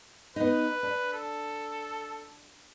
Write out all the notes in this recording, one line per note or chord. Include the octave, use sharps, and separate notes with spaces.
B3 D#4 B4
D4
A4